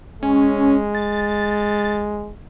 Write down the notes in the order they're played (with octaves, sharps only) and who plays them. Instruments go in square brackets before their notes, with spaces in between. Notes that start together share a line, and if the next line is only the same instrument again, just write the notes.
[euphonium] G#3 [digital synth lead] C#4
[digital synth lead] A6